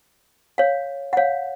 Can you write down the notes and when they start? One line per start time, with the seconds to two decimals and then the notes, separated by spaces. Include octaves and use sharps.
0.58 C#5 F5
1.13 F#5
1.17 C#5 F5